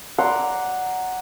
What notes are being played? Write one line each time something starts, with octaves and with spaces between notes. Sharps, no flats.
D5 F#5 A#5 C6